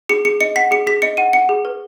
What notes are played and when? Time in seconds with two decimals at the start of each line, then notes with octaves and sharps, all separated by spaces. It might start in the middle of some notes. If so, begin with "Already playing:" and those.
0.09 G#4 C#7
0.25 G#4 C#7
0.41 D#5 C#7
0.56 F#5 B6
0.71 G#4 C#7
0.87 G#4 B6
1.02 D#5 C#7
1.17 F#5 D#7
1.33 F#5 C#7
1.49 G#4
1.65 B4